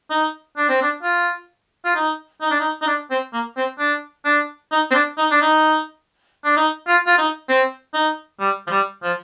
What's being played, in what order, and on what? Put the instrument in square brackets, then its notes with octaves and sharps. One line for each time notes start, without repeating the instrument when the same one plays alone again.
[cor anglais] D#4
D4
C4
D4
F4
F4
D#4
D#4
D4
D#4
D#4
D4
C4
A#3
C4
D4
D4
D#4
C4
D4
D#4
D4
D#4
D4
D#4
F4
F4
D#4
C4
D#4
G3
F3
G3
F3